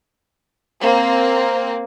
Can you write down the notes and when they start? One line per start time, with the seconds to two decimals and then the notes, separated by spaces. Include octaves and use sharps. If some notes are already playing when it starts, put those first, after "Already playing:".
0.81 A#3 C4